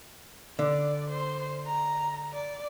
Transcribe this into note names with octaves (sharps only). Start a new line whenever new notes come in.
D3 D5
C5
A#5
D5